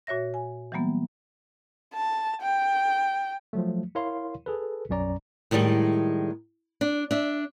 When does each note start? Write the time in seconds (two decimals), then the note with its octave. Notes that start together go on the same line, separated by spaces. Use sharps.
0.07 A#2 F#4 C#5 E5 A#6
0.34 G#5
0.72 E3 F#3 G3 A#3 B3
1.94 A5
2.42 G5
3.53 F3 F#3 A3
3.95 E4 A#4 C#5 F5 C6
4.46 G#4 A4 B4
4.89 B1 F#2 C#4 D5 A#5
5.51 A2 D#3 F3 G3 G#3
6.81 D4
7.11 D4 E5